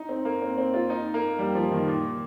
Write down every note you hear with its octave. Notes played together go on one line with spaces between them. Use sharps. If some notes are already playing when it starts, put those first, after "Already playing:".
Already playing: D#4
C4
A#3
C4
C4
F4
D#4
A#3
G3
F3
D#3
A#2